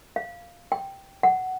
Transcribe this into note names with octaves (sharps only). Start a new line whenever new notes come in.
F5
G5
F#5